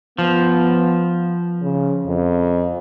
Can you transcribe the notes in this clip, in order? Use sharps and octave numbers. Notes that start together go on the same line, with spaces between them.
F3 B3
C#3
F2